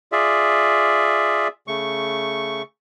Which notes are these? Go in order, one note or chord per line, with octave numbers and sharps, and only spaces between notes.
F4 G#4 D5 E5
C#3 A3 C#6